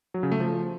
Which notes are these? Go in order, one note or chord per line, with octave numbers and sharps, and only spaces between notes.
F#3
C#3
A3
F3